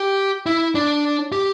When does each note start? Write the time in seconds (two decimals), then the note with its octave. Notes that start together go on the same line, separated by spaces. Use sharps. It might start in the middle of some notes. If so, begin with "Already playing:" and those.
Already playing: G4
0.46 E4
0.75 D4
1.32 G4